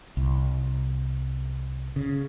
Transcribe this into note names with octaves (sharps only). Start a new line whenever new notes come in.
C2
C#3